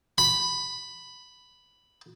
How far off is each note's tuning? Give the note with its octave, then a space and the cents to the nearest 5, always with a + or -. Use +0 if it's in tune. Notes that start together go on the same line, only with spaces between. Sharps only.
B5 +5